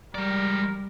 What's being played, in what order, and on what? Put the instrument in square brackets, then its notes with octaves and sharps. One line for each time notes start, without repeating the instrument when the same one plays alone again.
[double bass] G3 [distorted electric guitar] G#3 D5 [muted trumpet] A#4